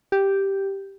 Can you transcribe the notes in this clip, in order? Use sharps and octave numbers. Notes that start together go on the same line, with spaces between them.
G4